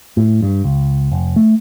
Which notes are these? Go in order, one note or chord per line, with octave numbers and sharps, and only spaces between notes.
A2
G2
C#2
F1
A3